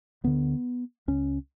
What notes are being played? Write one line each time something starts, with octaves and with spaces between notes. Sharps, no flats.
D2 D3 B3
C#2 C#3 C#4